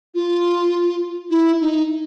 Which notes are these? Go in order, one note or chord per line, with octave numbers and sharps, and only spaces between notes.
F4
E4
D#4